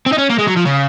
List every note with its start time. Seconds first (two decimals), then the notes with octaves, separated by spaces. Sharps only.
0.06 C4
0.12 D#4
0.18 C#4
0.29 A#3
0.38 G#3
0.47 F#3
0.56 F3
0.65 C#3